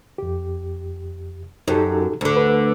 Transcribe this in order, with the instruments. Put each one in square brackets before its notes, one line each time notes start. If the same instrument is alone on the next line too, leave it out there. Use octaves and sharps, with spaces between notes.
[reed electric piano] F2 G4
[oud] F#2 [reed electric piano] D#4 G4 A4
[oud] D2 D3
[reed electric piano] B4